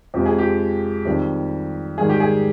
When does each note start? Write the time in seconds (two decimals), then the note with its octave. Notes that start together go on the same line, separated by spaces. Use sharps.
0.14 F2 C3 F3 G#3 G4
0.26 G#4
0.38 G4
1.05 F2 D#3 G3
1.98 G#2 D#3 G3 G#4
2.09 G4
2.20 G#4